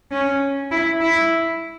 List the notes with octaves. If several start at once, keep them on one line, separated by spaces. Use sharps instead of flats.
C#4
E4
E4